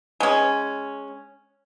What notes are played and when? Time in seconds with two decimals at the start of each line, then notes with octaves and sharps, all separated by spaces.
0.20 G#3 C#4